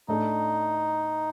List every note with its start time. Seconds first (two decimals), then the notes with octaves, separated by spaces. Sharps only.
0.08 A2 A3 D4 D#4 A4